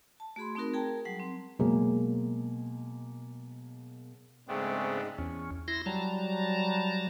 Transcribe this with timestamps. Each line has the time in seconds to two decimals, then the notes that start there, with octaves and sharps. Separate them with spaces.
0.20 A5
0.36 A3 F#4 G#4 B5 C6
0.55 A3 C4 D#4 F#4 A#4
0.74 G#4 A#4 G5 A5 A#5
1.05 F#3 G3 F#5
1.19 C4
1.59 B2 F#3 G#3 A#3 G#4
4.48 G#2 C#3 G#3 A3 B3 C4 D4
5.18 E2 C#4
5.68 E4 C6 A#6
5.86 F#3 G3 A5 A#5